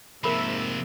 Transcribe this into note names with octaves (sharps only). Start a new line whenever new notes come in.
G#2 C3 F3 A#3 A#4 E5 B5